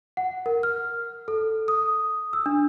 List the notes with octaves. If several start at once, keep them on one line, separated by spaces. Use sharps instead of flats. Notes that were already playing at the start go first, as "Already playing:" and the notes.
F#5
A#4
F6
A4
D#6
E6
D4